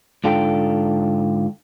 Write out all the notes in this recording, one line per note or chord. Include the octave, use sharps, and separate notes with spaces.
G#2 D3 F4 A4 G5